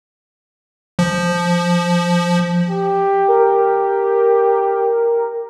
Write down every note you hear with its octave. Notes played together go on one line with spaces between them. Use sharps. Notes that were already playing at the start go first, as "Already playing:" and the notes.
F3
G4
A#4